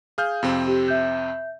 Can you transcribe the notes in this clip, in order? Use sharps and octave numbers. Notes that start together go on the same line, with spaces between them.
G#4 F5 F6 G6
F2 C3 C4
G4
E5 G6